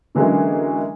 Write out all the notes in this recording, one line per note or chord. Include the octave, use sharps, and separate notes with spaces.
D3 E3 F#3 G#3 A#3 C#4